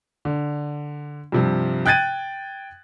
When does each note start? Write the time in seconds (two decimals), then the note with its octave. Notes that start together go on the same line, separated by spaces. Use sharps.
0.25 D3
1.32 G2 C3 F3
1.86 G5 F#6 G#6 A6 D#7